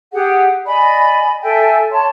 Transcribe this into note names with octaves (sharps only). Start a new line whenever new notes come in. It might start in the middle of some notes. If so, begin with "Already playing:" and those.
G4 G#4 F#5
D5 D#5 G#5 B5
A4 E5 G5 G#5
C#5 A5 C6